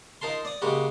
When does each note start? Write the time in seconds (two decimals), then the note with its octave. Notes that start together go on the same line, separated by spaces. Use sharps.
0.21 D#4 F4 A#4 A5 C6
0.45 D5 D#6
0.62 C#3 G#3 A#3 F#4 G4